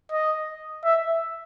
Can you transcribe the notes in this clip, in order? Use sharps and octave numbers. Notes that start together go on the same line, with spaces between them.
D#5
E5